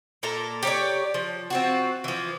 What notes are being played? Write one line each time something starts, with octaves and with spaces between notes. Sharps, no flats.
A#2 A4 A#4 A#5
G4 C#5 D5
F3
C4 F4 F#4
E3 F3